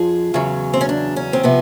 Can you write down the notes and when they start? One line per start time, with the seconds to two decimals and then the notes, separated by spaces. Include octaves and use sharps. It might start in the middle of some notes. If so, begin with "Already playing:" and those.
Already playing: F2 F3 G#4
0.34 E2 C#3 F#3
0.74 C4
0.81 C#4
0.89 D4
1.16 C#4
1.33 C4
1.43 C3 F3 B3